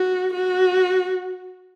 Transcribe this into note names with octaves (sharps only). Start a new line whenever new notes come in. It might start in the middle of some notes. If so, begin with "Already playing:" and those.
Already playing: F#4
F#4